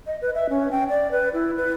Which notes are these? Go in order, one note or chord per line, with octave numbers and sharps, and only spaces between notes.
D#5
B4
E5
C#4
G5
D5
B4
E4
B4